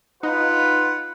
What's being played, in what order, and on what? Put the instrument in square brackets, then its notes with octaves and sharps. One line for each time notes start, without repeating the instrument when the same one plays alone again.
[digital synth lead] D#4 [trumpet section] F4 B4 [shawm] F#5